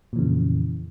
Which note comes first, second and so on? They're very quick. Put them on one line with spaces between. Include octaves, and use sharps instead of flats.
A#2 E3 C#3 F2